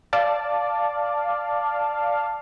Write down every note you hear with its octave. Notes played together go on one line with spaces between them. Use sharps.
D5 F5 A5